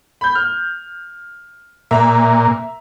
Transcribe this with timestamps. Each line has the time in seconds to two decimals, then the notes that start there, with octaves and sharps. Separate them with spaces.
0.21 B5 G6
0.35 F6
1.91 A#2 E5 A#5